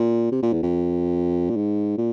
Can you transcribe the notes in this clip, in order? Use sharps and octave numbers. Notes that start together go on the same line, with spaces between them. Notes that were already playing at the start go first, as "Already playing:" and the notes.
Already playing: A#2
C3
A#2
E2
F2
A#2
G#2
A#2